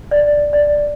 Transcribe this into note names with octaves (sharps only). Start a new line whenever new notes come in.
D5
D5